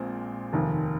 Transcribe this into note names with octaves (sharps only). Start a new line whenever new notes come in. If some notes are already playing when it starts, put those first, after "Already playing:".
Already playing: A#1 A#2 G#3 C4 F4
F1 D#2 D#3